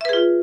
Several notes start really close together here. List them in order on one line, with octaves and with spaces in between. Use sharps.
E5 B4 G#4 F4